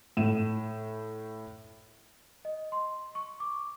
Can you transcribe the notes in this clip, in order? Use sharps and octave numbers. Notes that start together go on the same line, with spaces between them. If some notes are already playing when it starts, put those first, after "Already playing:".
A2 D#7 E7
D#5
C6
C#6
D6